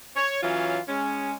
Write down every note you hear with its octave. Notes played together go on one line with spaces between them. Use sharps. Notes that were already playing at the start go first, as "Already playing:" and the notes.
C#5
E3 F#3 C#4 F4
G#3 C#4